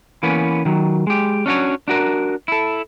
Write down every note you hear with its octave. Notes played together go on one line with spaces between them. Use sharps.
E3 A#3 B3 C#4
D#3 F#3
G#3 G4
C#4 D4 F#4 C#5
D4 F#4 A#4
E4 A4